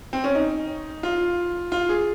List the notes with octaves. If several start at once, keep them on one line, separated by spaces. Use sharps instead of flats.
C4
C#4
D#4
F4
F4
G#4